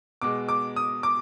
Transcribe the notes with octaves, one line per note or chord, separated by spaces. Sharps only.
B2 G#3 D6
D6
D#6
D6